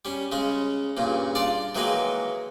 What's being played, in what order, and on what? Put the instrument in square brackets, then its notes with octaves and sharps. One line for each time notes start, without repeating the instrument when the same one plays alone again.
[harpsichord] G3 C#4
C#3 G#3 C#4
G2 A#2 C#3
D4 F4 D5
D#3 E3 F#3 G#3 A#3 D#4